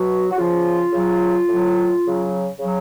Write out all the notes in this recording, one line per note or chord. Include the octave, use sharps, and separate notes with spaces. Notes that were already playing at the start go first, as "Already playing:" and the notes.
Already playing: B2 F#3 F#4
F#4
C#3 F3 F4
C#3 F#3
A2 F#3
C#3 F#3
C#3 F#3